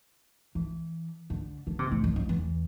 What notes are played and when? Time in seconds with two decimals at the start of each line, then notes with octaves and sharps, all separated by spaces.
0.55 E3
1.30 D3
1.67 D3
1.79 C3
1.92 A2
2.04 F#2
2.16 F#2
2.29 E2